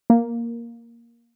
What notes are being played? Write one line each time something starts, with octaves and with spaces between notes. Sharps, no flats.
A#3